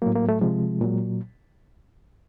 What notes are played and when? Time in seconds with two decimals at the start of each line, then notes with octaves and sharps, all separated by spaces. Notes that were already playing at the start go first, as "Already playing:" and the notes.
0.02 A2 F#3 A#3
0.15 A#3
0.29 A3
0.41 C3 F3 G#3
0.81 A#2 F#3